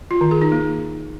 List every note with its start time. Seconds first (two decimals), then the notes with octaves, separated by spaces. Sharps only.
0.11 F4
0.21 D#3
0.31 G#4
0.42 D#4
0.52 A#3